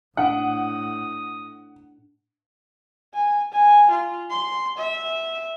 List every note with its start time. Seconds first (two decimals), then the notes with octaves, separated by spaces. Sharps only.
0.17 A2 D4 F#5 D#6 B6 D7
3.14 G#5
3.52 G#5
3.90 F4
4.30 C6
4.77 E5